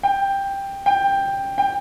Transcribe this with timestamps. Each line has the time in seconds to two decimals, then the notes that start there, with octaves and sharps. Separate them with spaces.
0.03 G5
0.86 G5
1.58 G5